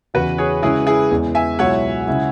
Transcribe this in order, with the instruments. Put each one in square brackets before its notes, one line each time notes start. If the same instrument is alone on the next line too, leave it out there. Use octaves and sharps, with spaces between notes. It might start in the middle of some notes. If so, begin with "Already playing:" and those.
[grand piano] E2 C#3 E3 [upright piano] F#4 B4
[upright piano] G#4 C#5
[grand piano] C#3 G#3 C#4 [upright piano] E4 G#4
[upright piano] E4 G#4
[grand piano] E2 E3 G#3 B3
[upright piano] E5 G#5
[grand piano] C#2 B2 F#3 E4 [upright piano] C#5 F#5
[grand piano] C#3 G#3 E4